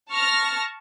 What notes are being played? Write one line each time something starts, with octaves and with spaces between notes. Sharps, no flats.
A5 C#6 F6 A#6